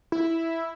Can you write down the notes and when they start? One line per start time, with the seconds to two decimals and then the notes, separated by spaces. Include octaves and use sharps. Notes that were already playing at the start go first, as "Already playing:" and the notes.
0.12 E4